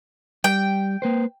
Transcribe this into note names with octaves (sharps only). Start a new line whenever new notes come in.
G3 G5
A#3 B4 C5